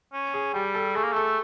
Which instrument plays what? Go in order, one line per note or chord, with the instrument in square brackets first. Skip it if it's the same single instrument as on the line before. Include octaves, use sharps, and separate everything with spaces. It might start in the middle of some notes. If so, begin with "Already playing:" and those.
[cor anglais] C#4
[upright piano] G#4
[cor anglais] G3 [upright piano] G4
[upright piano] A4
[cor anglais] A3 [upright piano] G#4
[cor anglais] A#3
[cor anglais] A3 [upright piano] A4